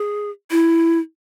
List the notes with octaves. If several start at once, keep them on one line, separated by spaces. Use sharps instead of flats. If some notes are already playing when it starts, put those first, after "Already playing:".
Already playing: G#4
E4